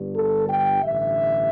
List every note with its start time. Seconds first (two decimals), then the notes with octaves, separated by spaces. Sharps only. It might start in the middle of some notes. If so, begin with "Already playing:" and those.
Already playing: G1 G2 D3 G3
0.16 A4
0.49 G5
0.82 A1 G2 D3 E5